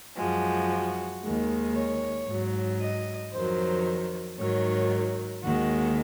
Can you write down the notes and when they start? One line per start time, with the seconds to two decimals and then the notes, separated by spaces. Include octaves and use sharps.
0.17 F#2 F3 G#3 F#4
1.22 D#2 D#3 G#3
1.75 C#5
2.28 G#2 F#3
2.81 D#5
3.33 F2 D#3 F#3 C5
4.38 G#2 D#3 F#3 C#5
5.43 D#2 D#3 G#3 F#4